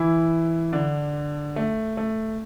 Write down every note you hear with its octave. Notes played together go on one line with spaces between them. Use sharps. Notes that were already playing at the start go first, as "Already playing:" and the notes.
Already playing: E3 E4
D3 D4
A3
A3